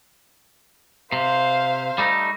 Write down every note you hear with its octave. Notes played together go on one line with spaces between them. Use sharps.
C3 C5 F5
G3 A3 D#4